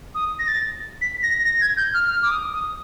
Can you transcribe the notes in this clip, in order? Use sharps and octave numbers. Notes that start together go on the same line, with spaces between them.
D#6
A#6
A6
B6
A#6
A#6
G#6
G6
F6
F6
D6
D#6
D#6